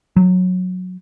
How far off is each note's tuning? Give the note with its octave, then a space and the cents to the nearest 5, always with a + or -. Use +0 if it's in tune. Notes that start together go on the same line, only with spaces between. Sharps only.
F#3 -15